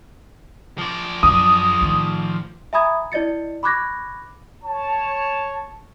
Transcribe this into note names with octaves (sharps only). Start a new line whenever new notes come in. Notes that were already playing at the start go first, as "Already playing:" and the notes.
F3 D5
F#2 D4 D#6
A2 D#3
E5 G#5 A#5 B5 D#6 G#6
E4 D5 D#5 A6 C#7
B5 C#6 D6 F#6 G#6 A#6
C#5 A5